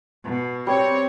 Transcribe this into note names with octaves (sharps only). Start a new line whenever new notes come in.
B2
G3 C4 C#5